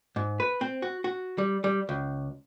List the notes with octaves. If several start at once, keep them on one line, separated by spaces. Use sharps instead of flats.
G#2
B4
C4
F#4
F#4
G3
G3
C#2